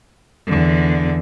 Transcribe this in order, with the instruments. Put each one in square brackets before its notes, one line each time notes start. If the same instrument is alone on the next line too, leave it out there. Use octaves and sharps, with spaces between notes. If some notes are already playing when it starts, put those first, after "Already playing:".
[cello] E2 D3